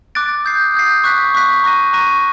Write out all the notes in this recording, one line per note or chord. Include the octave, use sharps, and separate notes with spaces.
D6 F#6 A6 D7
D#6 G6 C7
D#6 G6 C7
C#6 F#6 B6
C#6 F#6 B6
A#5 C#6 F#6 A#6 D#7
A#5 C#6 F#6 A#6 D#7